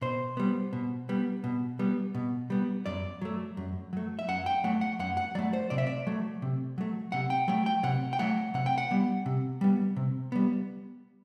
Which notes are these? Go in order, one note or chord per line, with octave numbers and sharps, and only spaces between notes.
B2 C5
G3 B3
B2
G3 B3
B2
G3 B3
B2
G3 B3
F#2 D5
F#3 A3
F#2
F#3 A3
E5
F#2 F#5
G5
F#3 A3 F#5
F#5
F#2 F#5
F#5
F#3 A3 D5
C5
C3 D5
E5
D5
F#3 A3
C3
F#3 A3
C3 F#5
G5
F#3 A3 G5
G5
C3 F#5
G5
F#3 A3 F#5
C3 F#5
G5
F#5
G3 B3
C3
G3 B3
C3
G3 B3